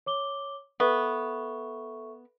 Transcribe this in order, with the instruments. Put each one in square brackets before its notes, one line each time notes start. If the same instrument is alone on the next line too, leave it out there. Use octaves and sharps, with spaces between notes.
[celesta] C#5 D6 G7
[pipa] B3 [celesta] A4 E5 C#6